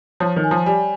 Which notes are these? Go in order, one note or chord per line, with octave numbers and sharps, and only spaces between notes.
F3 C#5
D#3
G#5
F3
G3 G#5